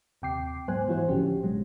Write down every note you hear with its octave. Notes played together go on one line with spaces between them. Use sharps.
D#2 C3 G5 D6 C7
G#2 F#3 B3 C5 G#5 F#6
E3 E4 F#4 C5
G1 A2 D3 F3 C#4 G4
B2 F#3 G#3